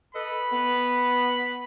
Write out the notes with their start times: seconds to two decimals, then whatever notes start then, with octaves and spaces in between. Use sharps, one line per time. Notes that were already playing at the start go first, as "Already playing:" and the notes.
0.15 A4 B4 D#5 B5
0.52 B3